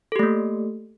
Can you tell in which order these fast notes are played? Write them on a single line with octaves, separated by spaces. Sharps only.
A4 G4 A3 A#3